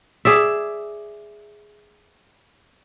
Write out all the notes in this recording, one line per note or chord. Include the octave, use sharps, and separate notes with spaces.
G#4 D5 E5